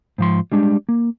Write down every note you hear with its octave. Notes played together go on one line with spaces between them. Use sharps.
G#2 F3 C6
G3 G#3 D4
A#3